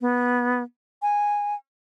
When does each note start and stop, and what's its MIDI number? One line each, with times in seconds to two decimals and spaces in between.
0.01 0.63 59
1.02 1.55 80